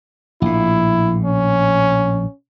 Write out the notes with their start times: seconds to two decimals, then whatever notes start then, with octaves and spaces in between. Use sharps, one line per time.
0.42 A#1 A2 E4
1.25 C#4